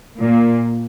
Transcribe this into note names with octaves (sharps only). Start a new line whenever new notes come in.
A#2